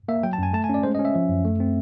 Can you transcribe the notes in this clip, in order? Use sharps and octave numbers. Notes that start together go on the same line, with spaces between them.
A#3 E5
F#3 G5
A5
F#2 G#5
A3 A5
G#5
C#4 D5
G#3 C5
D#5
C#4
E5
F3
F#2
A3
C4